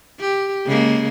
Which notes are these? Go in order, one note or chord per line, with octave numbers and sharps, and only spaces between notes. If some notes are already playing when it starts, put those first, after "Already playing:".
G4
C#3 G#3 A#3